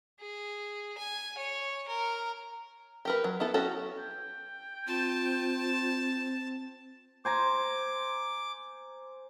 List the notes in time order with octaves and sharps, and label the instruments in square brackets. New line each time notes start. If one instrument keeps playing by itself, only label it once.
[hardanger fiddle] G#4
G#5
C#5
A#4
[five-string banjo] G4 A#4 B4
F#3
B3 E4 A4
C#4 F#4 G4 A4
[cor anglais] G5
[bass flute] C4 [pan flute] F4 [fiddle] A5
[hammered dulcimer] C5 G#5 A#5 [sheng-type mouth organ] D6